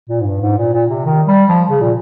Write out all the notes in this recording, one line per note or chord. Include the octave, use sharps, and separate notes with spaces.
A#2
G#2
G2
G#2
A#2
A#2
C3
D#3
G3
F3
C#3
A#2